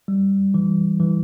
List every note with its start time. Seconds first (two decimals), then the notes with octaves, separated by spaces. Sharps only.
0.08 G3
0.54 E3
1.00 E3